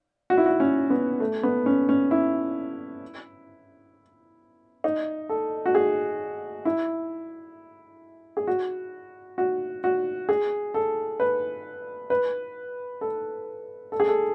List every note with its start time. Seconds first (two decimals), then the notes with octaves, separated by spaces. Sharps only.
0.30 F#4
0.38 E4
0.46 F#4
0.60 C#4
0.90 B3
1.20 A3
1.43 B3
1.66 C#4
1.89 C#4
2.11 E4
4.84 D#4
5.29 A4
5.66 F#4
5.75 G#4
6.65 E4
8.37 G#4
8.47 F#4
9.38 F#4
9.84 F#4
10.29 G#4
10.74 A4
11.20 B4
12.10 B4
13.01 A4
13.92 A4
14.00 G#4
14.08 A4